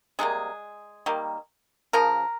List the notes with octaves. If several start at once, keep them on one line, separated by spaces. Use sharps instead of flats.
C3 G3 G#3 A#3 G#4
D#3 G3 A#3
C#3 F3 A#4